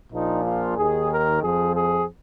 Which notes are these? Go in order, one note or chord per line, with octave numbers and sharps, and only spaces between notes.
A#1 A#2 F3 D#4
F4
D#2 D#3 G#4
A#4
F2 F3 G#4
G#4